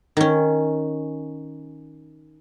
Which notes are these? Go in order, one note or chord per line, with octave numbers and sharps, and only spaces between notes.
D#3 C#4